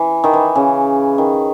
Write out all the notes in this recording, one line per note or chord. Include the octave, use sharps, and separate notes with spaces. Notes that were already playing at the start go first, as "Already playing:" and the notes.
Already playing: E3
D#3
E3
C#3
D#3